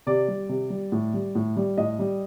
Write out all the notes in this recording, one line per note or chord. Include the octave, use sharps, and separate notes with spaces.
C3 D5
G3
C3
G3
A2
G3
A2
G3
A2 D#5
G3